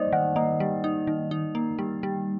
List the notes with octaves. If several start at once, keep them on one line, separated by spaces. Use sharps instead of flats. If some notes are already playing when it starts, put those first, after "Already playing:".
Already playing: G3 A#3 D#4 C5 D5 D#5
D#3 F#5
A#3 D#5
G3
D#4
D#3
D#4
A#3
G3
G3